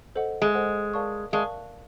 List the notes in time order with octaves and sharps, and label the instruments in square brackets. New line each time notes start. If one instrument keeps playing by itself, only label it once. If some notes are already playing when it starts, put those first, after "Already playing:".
[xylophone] A4 C5 D#5 F#5
[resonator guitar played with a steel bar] G#3
[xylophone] A4 C5 D#5 F#5
A#4 D5 F5 A5 C#6
[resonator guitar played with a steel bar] G#3 [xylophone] A#4 D5 F5 A5 C#6